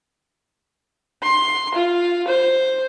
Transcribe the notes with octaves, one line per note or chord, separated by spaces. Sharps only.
C6
F4
C5